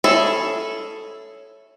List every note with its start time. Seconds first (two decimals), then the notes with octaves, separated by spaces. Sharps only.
0.04 C#4 E4 G#4 A4